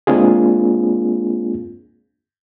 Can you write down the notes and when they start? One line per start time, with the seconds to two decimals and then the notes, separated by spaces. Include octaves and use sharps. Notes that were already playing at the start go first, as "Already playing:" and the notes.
0.07 G#3 A#3 C4 D4 F4 G#4